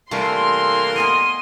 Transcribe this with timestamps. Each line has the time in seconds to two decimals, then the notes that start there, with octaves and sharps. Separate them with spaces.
0.11 C3 E3 G3 A3 A#3 A#4 C6
0.96 B3 D#5 G#5 D#7